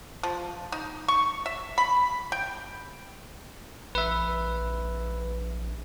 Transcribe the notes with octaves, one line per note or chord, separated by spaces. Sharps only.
F3
D#4
C#6
E5
B5
G5
A#1 B4 E5